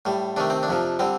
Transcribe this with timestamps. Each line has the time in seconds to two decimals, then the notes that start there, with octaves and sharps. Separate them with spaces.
0.05 A2 G3
0.36 C3 D#3 A3 D4
0.50 C4
0.63 D4
0.68 F2 C3 F3
0.99 D3 G3 C4